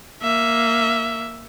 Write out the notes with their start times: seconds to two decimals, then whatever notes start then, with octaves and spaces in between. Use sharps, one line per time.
0.22 A#3 E5